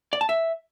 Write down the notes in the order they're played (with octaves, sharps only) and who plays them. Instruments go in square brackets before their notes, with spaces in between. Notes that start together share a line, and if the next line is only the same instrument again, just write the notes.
[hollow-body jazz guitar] D5
A5
E5